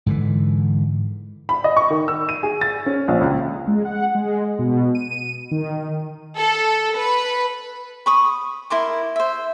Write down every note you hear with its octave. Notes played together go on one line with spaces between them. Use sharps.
G#2 D3 E3
B5
D#5
C#6
D#3
E6
D#7
G#4
A6
C#4
A#1
C#2
G#3
F#5
G#3
B2
D#7
D#3
A4
B4
B5 C#6 D#6
E4 A#4 C6 D6
C5 E5